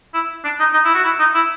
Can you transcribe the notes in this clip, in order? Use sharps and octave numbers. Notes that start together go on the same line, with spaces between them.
E4
D4
D#4
D#4
E4
F#4
E4
D#4
E4